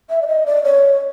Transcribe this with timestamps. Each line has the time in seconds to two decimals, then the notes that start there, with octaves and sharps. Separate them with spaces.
0.10 E5
0.22 D5
0.28 D#5
0.46 D5
0.64 C#5